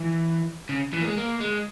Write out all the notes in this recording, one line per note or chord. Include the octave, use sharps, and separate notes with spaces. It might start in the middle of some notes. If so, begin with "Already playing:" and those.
Already playing: E3
C#3
E3
A#3
G#3
A#3
G#3